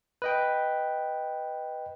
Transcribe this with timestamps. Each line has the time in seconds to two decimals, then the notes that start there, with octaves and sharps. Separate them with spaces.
0.22 B4 D#5 G5